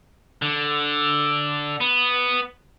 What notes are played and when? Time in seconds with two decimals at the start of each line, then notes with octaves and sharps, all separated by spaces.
0.42 D3
1.81 B3